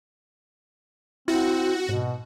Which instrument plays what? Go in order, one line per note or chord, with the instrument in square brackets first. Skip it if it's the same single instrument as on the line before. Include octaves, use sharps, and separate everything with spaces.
[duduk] C4 [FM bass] E4 [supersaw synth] F#4
[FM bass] G#2 [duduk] B2